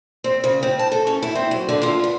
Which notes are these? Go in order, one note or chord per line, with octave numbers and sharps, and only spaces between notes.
C4
C#3
C4
A5
A4
C#4
E4
C4
F#3
D3
F4
B3